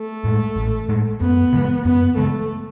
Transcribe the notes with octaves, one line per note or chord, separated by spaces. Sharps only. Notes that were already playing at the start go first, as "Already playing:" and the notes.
Already playing: A3
A2 G#3
A1
A2 G#3
F#2 B3
C#3 E3 G#3
F#2 B3
C#3 E3 G#3 A3